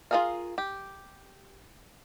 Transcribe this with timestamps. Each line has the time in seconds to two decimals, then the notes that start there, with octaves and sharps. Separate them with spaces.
0.11 F4 F#4 G#4 A#4 F5
0.58 G4